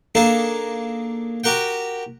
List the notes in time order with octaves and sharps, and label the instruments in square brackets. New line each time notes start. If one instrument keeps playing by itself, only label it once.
[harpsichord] A#3 D4 D#4 G#4 A4
F#4 G4 A#4 F#5 G5